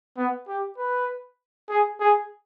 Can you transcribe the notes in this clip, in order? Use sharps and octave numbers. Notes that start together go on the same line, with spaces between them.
B3
G4
B4
G#4
G#4